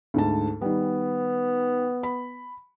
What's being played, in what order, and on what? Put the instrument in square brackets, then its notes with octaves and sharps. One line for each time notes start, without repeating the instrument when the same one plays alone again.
[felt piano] D2 G#2 A5
[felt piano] D#3 G3 [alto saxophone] B3
[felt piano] B5